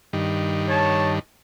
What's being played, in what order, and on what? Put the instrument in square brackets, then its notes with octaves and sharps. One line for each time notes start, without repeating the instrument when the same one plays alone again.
[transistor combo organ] G2 D#3
[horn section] C#5 A5